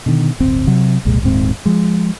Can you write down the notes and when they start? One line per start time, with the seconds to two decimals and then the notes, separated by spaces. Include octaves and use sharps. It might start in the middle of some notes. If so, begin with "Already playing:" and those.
0.06 B2 D3 D#3
0.40 D1 G1 C4
0.67 C3 F#3
1.05 F1 C2 A#2 G#3
1.23 D#1 G#2 C4
1.66 F3 G#3